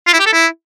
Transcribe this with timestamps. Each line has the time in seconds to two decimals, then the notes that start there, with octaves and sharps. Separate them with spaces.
0.07 F4
0.13 E4
0.20 G4
0.26 A4
0.33 E4